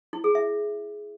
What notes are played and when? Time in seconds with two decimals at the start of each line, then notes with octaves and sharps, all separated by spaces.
0.13 E4
0.24 G#4
0.35 E5